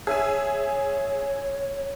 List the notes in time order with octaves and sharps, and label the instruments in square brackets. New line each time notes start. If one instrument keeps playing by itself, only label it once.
[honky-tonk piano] G#4 E5 G#5 [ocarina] C#5